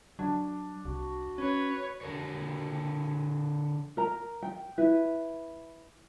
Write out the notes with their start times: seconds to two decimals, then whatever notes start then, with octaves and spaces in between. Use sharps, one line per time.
0.19 F#3 D4
0.85 C2 F#4
1.38 C#4 B4 C#5
2.01 D3 A#4 C#5
3.97 A#4 A#5
4.43 G5
4.78 E4 B4